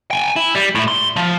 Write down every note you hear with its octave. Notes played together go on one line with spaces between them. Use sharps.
G5 G#5
E4
G3
A2 E4
C6
F3